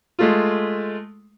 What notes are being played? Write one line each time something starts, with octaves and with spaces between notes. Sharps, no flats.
G#3 A3 F4